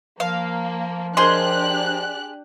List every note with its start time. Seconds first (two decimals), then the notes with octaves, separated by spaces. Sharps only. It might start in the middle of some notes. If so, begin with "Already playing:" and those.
0.20 F3 A#3 F5
1.17 D4 G4 G#4 A#4 C5 D#5 C6 F#6